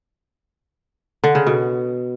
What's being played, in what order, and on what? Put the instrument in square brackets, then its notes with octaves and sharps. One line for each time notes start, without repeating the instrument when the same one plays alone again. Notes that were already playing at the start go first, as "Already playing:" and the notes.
[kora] D3
C#3
B2